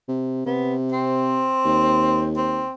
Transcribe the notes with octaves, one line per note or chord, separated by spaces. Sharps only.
C3
C3 B3
C4
D#2
C4